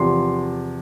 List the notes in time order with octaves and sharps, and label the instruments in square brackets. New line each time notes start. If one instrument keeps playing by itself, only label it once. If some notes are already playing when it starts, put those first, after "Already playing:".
Already playing: [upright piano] E2 C3 F3 C6